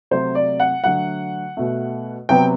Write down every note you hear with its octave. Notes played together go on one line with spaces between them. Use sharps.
C3 F#3 A3 C5
D5
F#5
D3 F#3 A3 F#5
B2 A3
C3 F#3 B3 G5